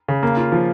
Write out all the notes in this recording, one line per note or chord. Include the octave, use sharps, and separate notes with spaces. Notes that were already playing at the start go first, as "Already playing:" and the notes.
C#3
A#3
F4
F3